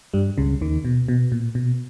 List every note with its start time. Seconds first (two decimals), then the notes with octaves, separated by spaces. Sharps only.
0.14 G2 G3
0.38 C#2 C#3
0.61 D#2 D#3
0.85 B2
1.08 B2
1.32 A#2
1.55 B2